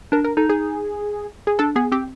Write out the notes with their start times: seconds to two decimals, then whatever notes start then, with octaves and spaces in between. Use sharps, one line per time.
0.12 D4 A#4
0.24 A#4
0.37 D#4 A4
0.50 G#4
1.47 G#4
1.59 D4 A4
1.76 B3 G#4
1.92 C4 G4